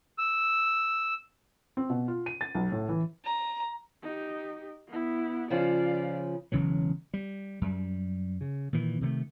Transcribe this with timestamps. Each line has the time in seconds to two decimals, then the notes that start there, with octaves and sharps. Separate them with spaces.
0.18 E6
1.77 C4
1.90 B2
2.08 F4
2.26 D#7
2.41 A6
2.55 B1
2.72 A2
2.89 E3
3.25 A#5
4.02 D#4 G4
4.88 B3 E4
5.50 C#3 F3 F4 D5 F5
6.52 E1 C#3 E3 F#3
7.14 G3
7.61 F#2 G3
8.41 C#3
8.73 A#2 D#3 E3
9.01 C3 D#3 G3 A3